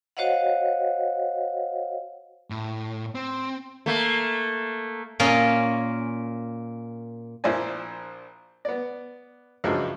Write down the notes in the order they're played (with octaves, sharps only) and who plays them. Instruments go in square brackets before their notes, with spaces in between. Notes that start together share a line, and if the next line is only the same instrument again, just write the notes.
[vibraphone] F#4 C5 C#5 D#5 F5 F#5
[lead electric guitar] A2
C4
[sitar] A3 A#3
[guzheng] A#2 A#3 C#4 F4 D#5
[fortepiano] A#1 F3 E4 C5 D5 G#5
B3 D5
C#2 G2 F3 F#3 G#3 A3